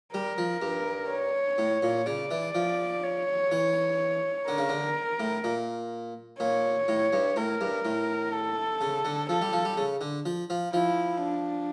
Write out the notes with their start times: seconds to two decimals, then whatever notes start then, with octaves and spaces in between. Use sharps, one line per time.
0.14 G3 A#4
0.38 F3
0.62 G2
1.10 C#5
1.58 A2
1.83 A#2
2.06 C#3 D5
2.31 E3
2.55 F3
3.03 C#5
3.52 E3
4.48 D3 A#4
4.58 C#3
4.69 D3
5.20 A2
5.44 A#2
6.40 A#2 C#5
6.88 A2
7.13 G2
7.36 A2 A#4
7.61 G2
7.85 A2
8.33 A4
8.81 C#3
9.05 D3
9.29 F3 A4
9.41 G3
9.53 F3
9.65 G3
9.77 C#3
10.01 D3
10.26 F3
10.50 F3
10.73 F3 E4
11.22 D4